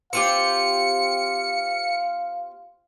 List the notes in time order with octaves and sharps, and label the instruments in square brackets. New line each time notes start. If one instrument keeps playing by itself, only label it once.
[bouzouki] C4 F4 G4 [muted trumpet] F5 [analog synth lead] C#7